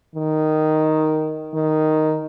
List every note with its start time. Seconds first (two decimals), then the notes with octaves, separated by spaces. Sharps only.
0.16 D#3
1.54 D#3